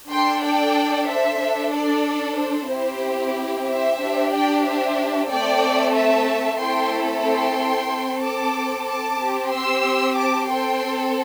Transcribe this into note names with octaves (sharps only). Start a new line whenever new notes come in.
D4 A4 G5 C6
D5 G5
C5 E5
D4 A4
D5
C5
C4 E4 G4
C5 E5
D4 G4
D5 G5
C5 E5
A3 C4 A4 D5 G5
E5 A5
A3 C4 E4 A4 G5 C6
G5 C6
C4 A4
A5 D6
A5 D6
C4 G4
C6 E6
A5 D6
C4 A4 G5 C6